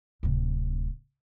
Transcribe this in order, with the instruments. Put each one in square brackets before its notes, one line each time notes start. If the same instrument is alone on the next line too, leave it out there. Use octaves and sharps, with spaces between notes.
[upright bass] D1 C3